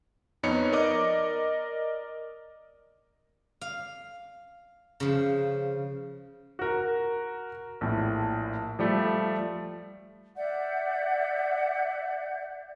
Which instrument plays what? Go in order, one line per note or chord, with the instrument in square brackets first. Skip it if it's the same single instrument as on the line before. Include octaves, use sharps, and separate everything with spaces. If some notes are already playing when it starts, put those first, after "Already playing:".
[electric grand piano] F2 B3 D#4 B4 C#5 C#7
A#4 D5 D#5 D6
[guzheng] F5
C#3 F3
[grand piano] F#4 A#4
A#1 A2
F3 G3 A3
[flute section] D5 E5 F#5 G6